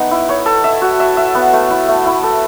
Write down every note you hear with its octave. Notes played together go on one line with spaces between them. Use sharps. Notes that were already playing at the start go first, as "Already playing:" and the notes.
Already playing: A3 B3 D#4
E4
C#5
A4
E5
F#4
E5
E5
B3
A3
E4
A3
E4
A4